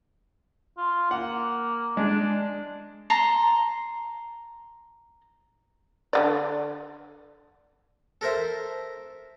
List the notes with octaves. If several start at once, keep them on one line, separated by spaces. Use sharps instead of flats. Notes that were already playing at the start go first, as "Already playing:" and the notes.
F4
A#3 F#5
G#3 D4
A5 A#5 C6
D3 A3 D5
A4 A#4 C5 E5